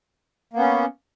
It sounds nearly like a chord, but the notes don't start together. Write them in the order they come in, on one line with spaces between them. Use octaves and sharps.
A#3 B3 C#4